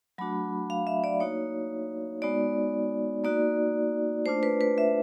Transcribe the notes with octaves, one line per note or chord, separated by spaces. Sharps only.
F#3 A3 D4 F#4 B5
F5
E5
D5
A#3 D#4 F#4 C#5
G#3 B3 D#4 F#4 D5
A#3 D#4 F#4 D5
A3 D4 F4 C5
B4
B4
E5